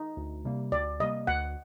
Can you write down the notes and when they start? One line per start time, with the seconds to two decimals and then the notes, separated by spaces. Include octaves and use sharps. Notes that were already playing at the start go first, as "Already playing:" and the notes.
Already playing: D#4
0.17 D2
0.45 C3 G3 A#3
0.72 D2 D5
1.00 C3 G3 A#3 D#5
1.27 D2 F#5